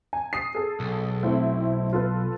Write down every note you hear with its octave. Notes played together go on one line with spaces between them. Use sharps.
G#5
D#6 C7
G#4 A4
B1
A3 C4 E4
F4 A4 B4